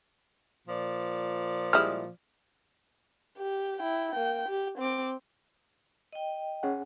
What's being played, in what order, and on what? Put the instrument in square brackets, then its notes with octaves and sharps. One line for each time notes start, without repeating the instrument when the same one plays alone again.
[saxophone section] A#2 F3 D5
[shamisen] G3 G#3 E4 [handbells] D#6 F6
[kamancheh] G4
E4 G5
A#3 G5
G4
C4 D6
[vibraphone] D#5 G5
[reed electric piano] C#4 G#4 F#5